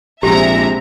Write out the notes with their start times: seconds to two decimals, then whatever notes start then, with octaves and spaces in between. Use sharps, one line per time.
0.23 A#1 C3 G#3 C4 G4 E5 A#5